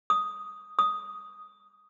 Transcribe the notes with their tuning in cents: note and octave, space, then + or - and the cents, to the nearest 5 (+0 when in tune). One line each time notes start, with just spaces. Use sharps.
D#6 +0
D#6 +0